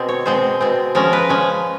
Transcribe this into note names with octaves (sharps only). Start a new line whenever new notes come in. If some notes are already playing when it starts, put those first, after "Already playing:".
Already playing: B2 G#3 C4
C#5
B2 G#3 C4 C5
B2 G#3 C4
F3 G#3 C#4 A#4
B4
F3 G#3 C#4